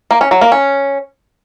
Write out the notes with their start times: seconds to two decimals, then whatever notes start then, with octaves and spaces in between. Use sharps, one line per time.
0.11 A#3
0.21 C#4
0.31 F#3
0.41 A#3
0.52 C#4